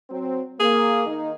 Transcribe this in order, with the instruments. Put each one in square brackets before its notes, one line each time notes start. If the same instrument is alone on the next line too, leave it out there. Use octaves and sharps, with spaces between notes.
[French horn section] F#3 C4
[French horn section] A#3 [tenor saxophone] G#4
[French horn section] D#3 D#4